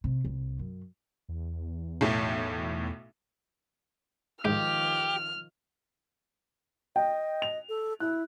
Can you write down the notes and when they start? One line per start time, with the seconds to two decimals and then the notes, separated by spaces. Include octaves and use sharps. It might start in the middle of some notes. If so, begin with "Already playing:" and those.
0.04 C3
0.25 C2
0.59 F#2
1.29 E2
2.01 B1 A2
4.45 G#2 D#3 F3 G4 F6
6.96 D#5 G5
7.42 F7
7.69 A4
8.00 E4 F#6